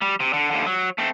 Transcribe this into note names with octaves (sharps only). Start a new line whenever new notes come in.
G3
C3
D3
D#2 D3
F#3
A3 C4